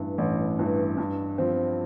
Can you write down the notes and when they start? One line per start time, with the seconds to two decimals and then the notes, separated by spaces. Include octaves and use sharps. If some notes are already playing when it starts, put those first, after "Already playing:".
Already playing: A1 G2 E3
0.18 A1
0.59 G2 E3
0.98 G2
1.38 F3 C4